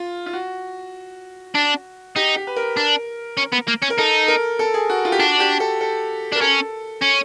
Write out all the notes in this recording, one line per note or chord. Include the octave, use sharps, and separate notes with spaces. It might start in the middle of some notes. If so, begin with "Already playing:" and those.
Already playing: F4
F4
F#4
D4
D#4 G4
G4
B4
A#4
D4
C#4
B3
A#3
C#4
A#4
D#4 A4
A#4
A4
G#4
F#4
F4
G4
D4 F#4
G4
A4
A4
D4 A#4
C#4 A4
C#4